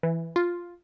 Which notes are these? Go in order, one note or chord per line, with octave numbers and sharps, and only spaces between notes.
E3
F4